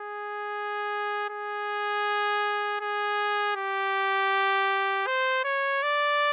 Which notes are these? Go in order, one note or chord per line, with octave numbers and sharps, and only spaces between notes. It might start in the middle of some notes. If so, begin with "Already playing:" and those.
Already playing: G#4
G#4
G#4
G4
C5
C#5
D5